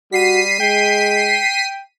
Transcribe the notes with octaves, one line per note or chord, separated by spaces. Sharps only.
G3 F#4 B6 C7 D#7
G#3 G5